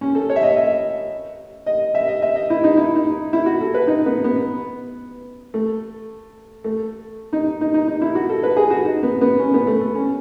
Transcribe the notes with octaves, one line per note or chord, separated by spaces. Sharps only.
C#4
A4
C#5
E5
D#5
E5
D#5
E5
D#5
E5
D#5
E4
D#4
E4
D#4
E4
F#4
A4
B4
D#4
B3
B3
A3
A3
D#4
D#4
D#4
D#4
E4
F#4
A4
B4
G#4
F#4
D#4
B3
B3
C#4
B3
A3
A3
C#4